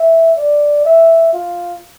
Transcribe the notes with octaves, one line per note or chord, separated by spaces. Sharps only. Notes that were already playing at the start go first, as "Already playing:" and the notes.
Already playing: E5
D5
E5
F4